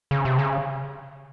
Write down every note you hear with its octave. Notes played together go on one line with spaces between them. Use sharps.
C#3
C3
C#3